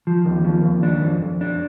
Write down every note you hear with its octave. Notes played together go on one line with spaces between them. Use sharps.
F3
D#2
F3
D#2
D4
F2
F2
D4